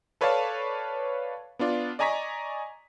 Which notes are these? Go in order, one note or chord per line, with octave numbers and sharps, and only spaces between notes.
A4 B4 C#5 D5 F5 A5
B3 D4 F4 D5
D5 D#5 G#5 A#5 C#6 B6